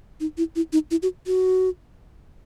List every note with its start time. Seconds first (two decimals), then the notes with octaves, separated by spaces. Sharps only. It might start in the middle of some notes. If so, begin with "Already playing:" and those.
0.20 D#4
0.38 E4
0.56 E4
0.73 D#4
0.91 E4
1.02 F#4
1.27 F#4